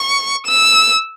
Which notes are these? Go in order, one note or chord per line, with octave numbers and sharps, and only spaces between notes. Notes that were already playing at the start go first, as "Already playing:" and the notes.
Already playing: C#6
E6